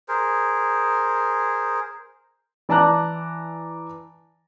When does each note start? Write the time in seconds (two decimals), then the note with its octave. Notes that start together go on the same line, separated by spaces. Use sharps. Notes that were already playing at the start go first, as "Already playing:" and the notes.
0.08 G#4 A#4 C5
2.69 E3 D5 A5 A#5 F#6